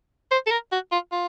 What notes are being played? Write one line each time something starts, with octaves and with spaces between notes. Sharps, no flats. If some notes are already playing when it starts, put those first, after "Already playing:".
C5
A4
A#4
F#4
F4
F4